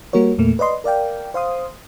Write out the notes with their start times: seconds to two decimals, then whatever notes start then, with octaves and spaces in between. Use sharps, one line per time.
0.13 G3 A#3 F#4 A#4 C#5
0.38 E2 A#2 A3 A#3
0.59 B4 D5 D#5 C6
0.84 A#4 D5 F5 G5
1.34 C5 F5 C6 D#6